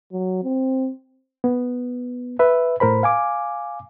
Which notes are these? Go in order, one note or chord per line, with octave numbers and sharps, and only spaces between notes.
F#3
C4
B3
B4 E5
A2 A#4 C5 B5
F5 G#5 D6